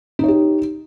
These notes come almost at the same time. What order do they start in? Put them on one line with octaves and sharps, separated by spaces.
D#4 C#5 G4